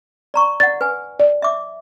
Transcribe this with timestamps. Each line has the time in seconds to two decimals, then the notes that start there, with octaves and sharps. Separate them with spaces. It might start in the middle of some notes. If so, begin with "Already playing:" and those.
0.34 D5 A#5 C#6
0.60 D5 F#5 A6
0.81 B4 G#5
1.20 D5
1.42 E5 D6